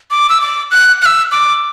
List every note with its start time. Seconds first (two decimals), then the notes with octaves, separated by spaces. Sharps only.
0.11 D6
0.29 E6
0.41 D6
0.71 F#6
1.02 F#6
1.06 E6
1.32 D6